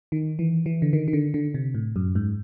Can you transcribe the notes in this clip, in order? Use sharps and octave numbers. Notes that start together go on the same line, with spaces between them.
D#3
E3
E3
D3
D#3
D#3
D3
D3
C3
A2
F#2
G#2